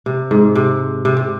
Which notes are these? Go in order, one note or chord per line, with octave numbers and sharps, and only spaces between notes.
C3
G#2
C3
C3
C3